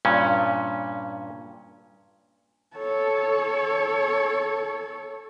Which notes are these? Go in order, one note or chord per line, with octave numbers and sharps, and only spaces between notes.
G2 A#2 C#4
A4 C#5